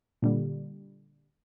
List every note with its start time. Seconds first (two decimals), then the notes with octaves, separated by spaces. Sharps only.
0.22 A#2 D3 G3